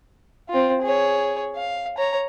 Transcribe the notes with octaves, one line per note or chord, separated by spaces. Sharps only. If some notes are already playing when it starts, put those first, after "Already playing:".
C4 F4
G#4 C#5
F5
C#5 A#5